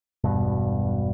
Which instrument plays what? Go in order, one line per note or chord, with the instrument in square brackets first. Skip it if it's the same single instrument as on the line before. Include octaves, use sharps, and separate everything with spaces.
[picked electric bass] E1 G2 B2